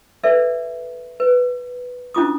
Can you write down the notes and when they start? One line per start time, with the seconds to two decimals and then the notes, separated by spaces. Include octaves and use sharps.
0.24 A4 B4 D5 E5
1.20 B4
2.14 C#4 D4 E4 F4 D6 D#6